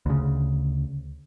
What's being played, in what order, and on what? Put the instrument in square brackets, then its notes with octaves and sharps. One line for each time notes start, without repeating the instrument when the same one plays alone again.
[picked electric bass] D2 C#3